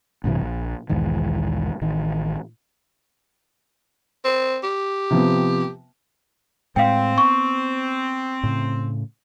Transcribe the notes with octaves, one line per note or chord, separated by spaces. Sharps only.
A#1 G2 C3 E3
A#1
B1 E2 G#2 D#3
A1 D#3
C4
G4
C3 F3 B3
A2 G#3 C4 F5 G5
B3 C#6
A2 C#3